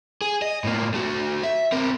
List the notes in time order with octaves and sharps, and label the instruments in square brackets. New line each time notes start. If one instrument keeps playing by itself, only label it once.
[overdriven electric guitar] G#4
D#5
A2 A#3
A3 F#4
E5
C4 A#4